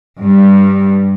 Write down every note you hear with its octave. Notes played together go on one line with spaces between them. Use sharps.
G2